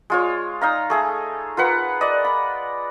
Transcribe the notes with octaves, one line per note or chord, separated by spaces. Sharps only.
G#3 F4 C#5
D#4 F5 A#5
A3 G#4 A4
F4 A#4 B4 F#5
D5 D#5
B5